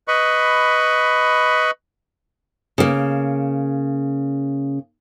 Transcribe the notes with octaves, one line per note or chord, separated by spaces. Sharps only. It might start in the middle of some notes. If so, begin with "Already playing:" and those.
B4 D#5 B5 C#6
C#3 A#3